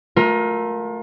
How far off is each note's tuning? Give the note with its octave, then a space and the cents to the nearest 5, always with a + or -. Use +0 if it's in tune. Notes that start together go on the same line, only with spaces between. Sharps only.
A3 +0 F4 +35 A#4 +15